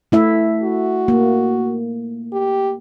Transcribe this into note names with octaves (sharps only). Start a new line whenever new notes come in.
A3 E4 E5
F#4
A#3
G4